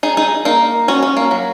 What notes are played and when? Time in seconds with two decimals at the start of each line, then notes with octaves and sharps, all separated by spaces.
0.03 D#4 G#4
0.17 D#4 G#4
0.45 A#3 D#4
0.88 C#4 F#4
1.03 C#4
1.17 A#3
1.31 F#3